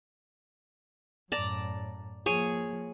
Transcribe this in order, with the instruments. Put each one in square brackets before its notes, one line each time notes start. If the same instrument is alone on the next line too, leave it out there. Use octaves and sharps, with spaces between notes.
[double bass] F#2 A2 [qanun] D5 A5 A#5
[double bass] F3 A#3 [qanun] G#4 C#5 G#5